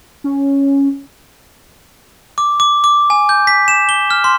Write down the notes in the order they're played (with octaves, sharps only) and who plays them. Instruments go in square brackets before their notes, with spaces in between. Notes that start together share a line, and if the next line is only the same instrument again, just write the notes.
[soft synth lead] C#4
[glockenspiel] D6
D6
D6
G#5
G6
B6
E7
G7
F6
C6